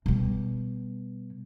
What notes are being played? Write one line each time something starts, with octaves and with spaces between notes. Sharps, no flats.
B2 G3